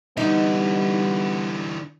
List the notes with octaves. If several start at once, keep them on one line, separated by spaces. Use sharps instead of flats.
D3 E3 G3 B3 D#4